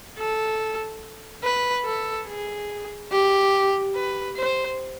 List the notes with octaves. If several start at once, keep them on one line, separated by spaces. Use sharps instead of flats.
A4
B4
A4
G#4
G4
B4
C5